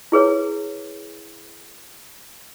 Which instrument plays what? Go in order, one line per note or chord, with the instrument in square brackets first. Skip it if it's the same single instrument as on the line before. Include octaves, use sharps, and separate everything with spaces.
[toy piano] E4 G#4 B4 C#5